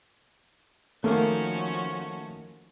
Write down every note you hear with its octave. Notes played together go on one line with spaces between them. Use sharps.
D#3 F3 A3 A#3 C#4 F#4 C5